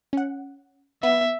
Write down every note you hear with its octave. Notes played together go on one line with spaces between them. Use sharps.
C#4 F#5
B3 E5